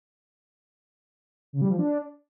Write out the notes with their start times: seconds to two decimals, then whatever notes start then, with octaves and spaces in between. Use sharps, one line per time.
1.53 C#3
1.62 G3
1.70 F3
1.79 D4